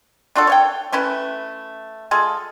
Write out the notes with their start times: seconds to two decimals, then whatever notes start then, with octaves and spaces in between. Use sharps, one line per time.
0.36 D4 F4 F#4 A4
0.47 C#5 F5 G5
0.92 A3 C#4 E4 B4
2.11 G#3 F4 G#4 A4